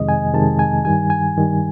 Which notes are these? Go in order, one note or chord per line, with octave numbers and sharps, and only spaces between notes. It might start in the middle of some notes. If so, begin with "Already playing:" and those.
Already playing: F2 C3 D#3 G#3 D#5
G#5
F2 C3 D#3 G#3 A5
G#5
G2 D#3 G3 G#5
G#5
G2 D#3 G3